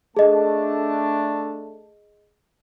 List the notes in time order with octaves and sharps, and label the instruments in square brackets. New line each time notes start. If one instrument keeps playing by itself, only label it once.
[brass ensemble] A3 D4 A5 [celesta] G#4 D#5